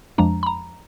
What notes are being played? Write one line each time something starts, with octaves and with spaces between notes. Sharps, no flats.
F2 F3 G#3 D4 A#5
B5
A#5